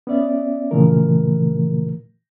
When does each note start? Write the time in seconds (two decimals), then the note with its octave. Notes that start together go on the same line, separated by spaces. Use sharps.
0.07 B3 C#4 D5 E5
0.71 A#2 C#3 E3 F3 A3 A#4